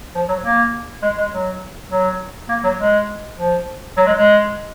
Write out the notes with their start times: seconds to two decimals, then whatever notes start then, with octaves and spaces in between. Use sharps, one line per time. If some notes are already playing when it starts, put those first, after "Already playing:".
0.15 F3
0.28 F#3
0.43 A#3
1.02 G#3
1.18 G#3
1.32 F#3
1.91 F#3
2.49 A#3
2.64 F#3
2.79 G#3
3.38 F3
3.97 F#3
4.06 G#3
4.16 G#3